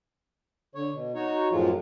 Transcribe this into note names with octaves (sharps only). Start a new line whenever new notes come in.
D3 C#5
B2
D#4 F#4 C#5
F#2 A2 F3 F#3 G#3 F4